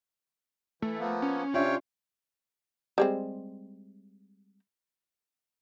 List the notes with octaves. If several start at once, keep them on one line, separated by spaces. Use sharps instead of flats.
E3 A3
F3 A#3 B3
C#4
C3 C#4 D4 F4 C#5 E5 G5
G3 G#3 C4